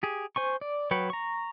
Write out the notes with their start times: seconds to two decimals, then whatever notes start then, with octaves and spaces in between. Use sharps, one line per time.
0.03 G4 G#4
0.36 C5 G#5 C#6
0.61 D5
0.91 F#3 B4 G5 C#6
1.10 A#5 C#6